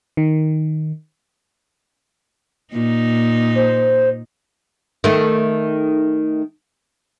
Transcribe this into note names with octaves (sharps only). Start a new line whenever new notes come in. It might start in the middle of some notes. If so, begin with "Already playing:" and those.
D#3
A#2 D#4
C5
D#3 A3